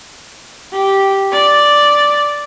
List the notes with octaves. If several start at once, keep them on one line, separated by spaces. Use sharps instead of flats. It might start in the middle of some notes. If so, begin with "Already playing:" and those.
G4
D5